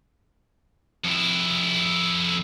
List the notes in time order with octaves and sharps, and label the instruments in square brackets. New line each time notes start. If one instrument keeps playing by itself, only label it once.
[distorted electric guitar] F2 E4